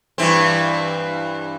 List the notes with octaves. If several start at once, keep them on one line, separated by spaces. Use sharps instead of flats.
G2 E3 C4